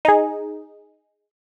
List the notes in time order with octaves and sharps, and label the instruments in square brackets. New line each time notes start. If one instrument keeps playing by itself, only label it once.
[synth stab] D#4 G#4